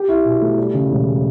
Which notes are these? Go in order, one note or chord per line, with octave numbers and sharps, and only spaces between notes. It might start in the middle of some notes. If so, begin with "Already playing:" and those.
Already playing: G4
E4
B2
A3
G3
C#3
E1